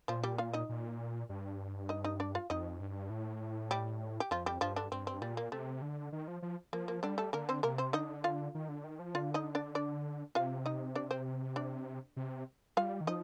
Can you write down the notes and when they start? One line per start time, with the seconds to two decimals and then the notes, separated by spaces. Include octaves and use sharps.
0.08 A#2 F3 F4
0.23 G3 G4
0.38 F4 F5
0.53 D#4 D#5
0.69 A#2
1.29 G2
1.89 D#4 D#5
2.04 D#4 D#5
2.20 D4 D5
2.35 F4 F5
2.50 F2 D#4 D#5
2.80 G2
3.10 A2
3.71 G3 G4
4.20 G4
4.31 F2 F3 F4
4.46 G3 G4
4.61 G2 F3 F4
4.76 D3 D4
4.92 G2 C4
5.07 C4
5.22 A#2 G3
5.37 A#3
5.52 C3 A3
5.82 D3
6.12 D#3
6.28 F3
6.42 F3
6.73 F3 A#3
6.88 A#3
7.03 D3 G3 D4
7.18 A3 A4
7.33 D3 A#3 A#4
7.49 C4 C5
7.63 C3 A#3 A#4
7.78 C4 C5
7.93 D3 D#4 D#5
8.24 F4 F5
8.55 D#3
8.69 D3
8.84 D#3
8.99 F3
9.14 D3 F4 F5
9.34 D#4 D#5
9.55 D4 D5
9.75 D4 D5
10.35 C3 F4 F5
10.66 D#4 D#5
10.95 D4 D5
11.11 C4 C5
11.56 D4 D5
12.16 C3
12.77 G3 F4 F5
13.01 D#3
13.07 F3 D#4 D#5